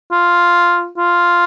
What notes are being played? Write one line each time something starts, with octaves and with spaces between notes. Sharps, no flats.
F4
F4